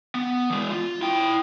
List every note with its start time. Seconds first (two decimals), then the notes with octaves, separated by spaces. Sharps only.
0.15 B3
0.50 E3 G#3
0.70 F4
1.02 E4 G5